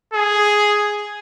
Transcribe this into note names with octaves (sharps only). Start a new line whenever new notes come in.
G#4